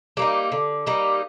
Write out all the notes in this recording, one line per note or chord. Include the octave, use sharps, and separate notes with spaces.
G3 A#3 D#4
D3
G3 A#3 D#4